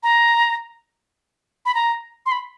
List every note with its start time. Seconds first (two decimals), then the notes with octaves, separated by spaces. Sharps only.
0.03 A#5
1.66 B5
1.74 A#5
2.26 C6
2.32 B5